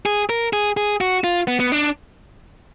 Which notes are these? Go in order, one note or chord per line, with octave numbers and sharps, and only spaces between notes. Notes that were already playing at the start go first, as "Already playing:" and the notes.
G#4
A#4
G#4
G#4
F#4
F4
B3
B3
D4